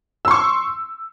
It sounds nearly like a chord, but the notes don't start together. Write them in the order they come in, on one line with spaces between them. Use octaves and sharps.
E6 C6 C#6